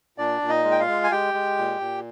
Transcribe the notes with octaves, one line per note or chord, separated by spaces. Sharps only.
A#2 D4 D5
A#2
D#4 D#5
G#3
G5
F4 F5
G#3
G#5
G#3 G4 G5
G#3
A#2
A#2